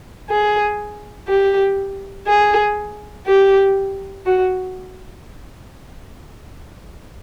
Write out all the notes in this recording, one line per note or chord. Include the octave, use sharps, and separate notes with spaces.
G#4
G4
G#4
G4
F#4